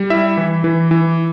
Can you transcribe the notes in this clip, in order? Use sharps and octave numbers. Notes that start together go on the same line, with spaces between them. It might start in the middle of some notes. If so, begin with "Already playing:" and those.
Already playing: G3
E4 E5
E3
E3
E3